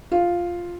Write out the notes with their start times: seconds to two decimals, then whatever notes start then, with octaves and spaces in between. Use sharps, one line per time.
0.12 F4